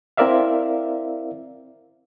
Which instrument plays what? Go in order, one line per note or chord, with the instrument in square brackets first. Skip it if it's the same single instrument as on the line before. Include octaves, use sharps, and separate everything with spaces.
[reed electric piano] C4 E4 A#4 D5 E5 F5